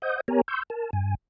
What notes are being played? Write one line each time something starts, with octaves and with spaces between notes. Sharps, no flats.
C5 D#5 F#5 D#6 G6
B3 G4 A#4 C#5 G#5 A#5
C6 C#6 E6 G6
A#4 A5
G2 G#5